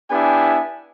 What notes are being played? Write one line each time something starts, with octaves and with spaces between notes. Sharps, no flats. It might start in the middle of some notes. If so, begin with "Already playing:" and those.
B3 D4 E4 G4 G#5